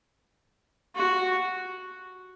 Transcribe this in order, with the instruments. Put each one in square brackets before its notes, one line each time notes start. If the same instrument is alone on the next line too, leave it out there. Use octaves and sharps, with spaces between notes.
[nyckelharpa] F#4